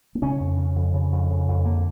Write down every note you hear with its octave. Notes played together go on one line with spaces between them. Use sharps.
A#3
C#3 C#4
F2
C#3
F2
C#3
F2
C#3
F2
D3 A#3